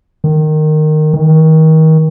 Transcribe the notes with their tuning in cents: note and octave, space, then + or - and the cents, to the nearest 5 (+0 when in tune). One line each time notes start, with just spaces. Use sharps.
D#3 -15
D#3 +30